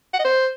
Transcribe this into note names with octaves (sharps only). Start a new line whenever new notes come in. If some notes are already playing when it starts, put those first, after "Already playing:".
F#5
D#5
C5